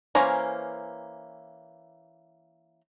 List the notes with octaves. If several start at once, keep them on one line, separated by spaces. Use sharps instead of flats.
E3 A#3 C#4 C5 A#5